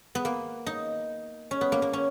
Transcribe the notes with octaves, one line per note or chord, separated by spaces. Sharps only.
B3
A#3
D#4
C#4
B3
A#3
A#3
C#4